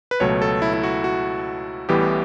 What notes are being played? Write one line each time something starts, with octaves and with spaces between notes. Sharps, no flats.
B4
C#2 B2 F#3 A3 C#5
A4
E4
E4
F#4
F#4
A1 A2 E3 G3 B3 G4